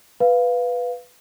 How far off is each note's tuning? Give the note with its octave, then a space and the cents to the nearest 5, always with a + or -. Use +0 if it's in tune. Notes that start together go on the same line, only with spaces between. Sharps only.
B4 +0 F5 +0